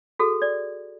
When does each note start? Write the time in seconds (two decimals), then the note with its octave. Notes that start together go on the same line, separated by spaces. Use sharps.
0.19 F#4 G#4 A4
0.42 D5